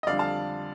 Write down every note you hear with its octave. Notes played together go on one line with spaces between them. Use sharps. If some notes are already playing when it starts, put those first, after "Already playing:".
D#5
F2 D3 G3 D5 F5
F5 A5